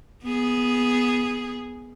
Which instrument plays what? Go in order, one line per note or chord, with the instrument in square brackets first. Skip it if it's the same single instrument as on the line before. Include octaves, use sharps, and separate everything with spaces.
[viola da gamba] B3 G#4